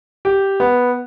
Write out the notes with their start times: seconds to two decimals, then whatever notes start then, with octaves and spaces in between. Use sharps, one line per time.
0.25 G4
0.60 B3